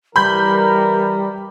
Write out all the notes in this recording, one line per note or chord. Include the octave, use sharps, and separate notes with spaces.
E3 G3 A#4 B5 G6